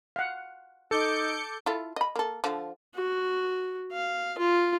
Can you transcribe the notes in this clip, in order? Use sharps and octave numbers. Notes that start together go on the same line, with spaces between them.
F5 F#5
D#4 A4 D6 G6 C#7
E4 F4 A4
D#5 B5
A#3 A4
D3 F3
F#4
F5
F4